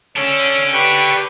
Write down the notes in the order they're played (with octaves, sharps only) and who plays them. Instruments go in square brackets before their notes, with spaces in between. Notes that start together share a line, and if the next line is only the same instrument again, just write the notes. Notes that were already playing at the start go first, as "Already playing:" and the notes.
[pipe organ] C#4 [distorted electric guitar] D4 A4
[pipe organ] G4 B4 C#6